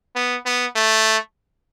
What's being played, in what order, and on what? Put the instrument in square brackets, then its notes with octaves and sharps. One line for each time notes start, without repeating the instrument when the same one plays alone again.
[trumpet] B3
B3
A3